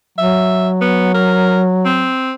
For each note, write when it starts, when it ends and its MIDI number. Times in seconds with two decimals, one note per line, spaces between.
0.18 2.13 54
0.18 0.68 76
0.81 1.10 59
1.14 1.62 70
1.85 2.33 60